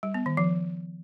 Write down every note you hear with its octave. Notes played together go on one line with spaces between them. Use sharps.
G3
B3
D#3
F3